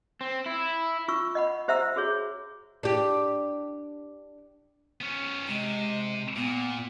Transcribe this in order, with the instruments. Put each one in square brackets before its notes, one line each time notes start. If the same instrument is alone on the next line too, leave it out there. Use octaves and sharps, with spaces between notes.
[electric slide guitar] C4
E4
[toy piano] F4 C#6 E6
D#5 F#5 B5
G4 C5 E5 F#5 A#5 E6
F#4 G#4 C#5
[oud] D4 G4
[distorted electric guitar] B3 C#4
[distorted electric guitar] C3 [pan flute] G#3
[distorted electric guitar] A#2 [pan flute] B3